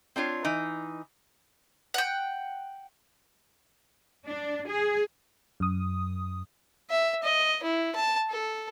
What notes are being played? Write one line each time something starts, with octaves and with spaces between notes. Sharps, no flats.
C4 D4 F4 C#5
E3 D#4
F#5 G5
D4
G#4
F#2 D#6
E5
D#5
E4
A5
A4